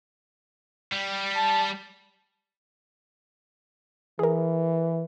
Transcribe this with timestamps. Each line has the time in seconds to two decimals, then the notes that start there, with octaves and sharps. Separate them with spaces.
0.92 G3
1.36 A5
4.19 E3 G#4 A#4